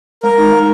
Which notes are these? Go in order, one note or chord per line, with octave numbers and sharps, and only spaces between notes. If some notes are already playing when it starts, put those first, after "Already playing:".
G#3 A#4
D#4
G#3